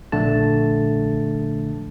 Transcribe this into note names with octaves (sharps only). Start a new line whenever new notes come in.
A#1 D3 A3 A5